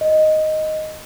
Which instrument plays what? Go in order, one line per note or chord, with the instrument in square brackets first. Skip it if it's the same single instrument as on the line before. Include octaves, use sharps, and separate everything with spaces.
[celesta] D#5